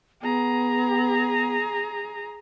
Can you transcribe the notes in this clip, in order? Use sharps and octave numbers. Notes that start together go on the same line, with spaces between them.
B3 G#4 A#5